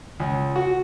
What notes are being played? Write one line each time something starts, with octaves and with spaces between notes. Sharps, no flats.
C#2
F#4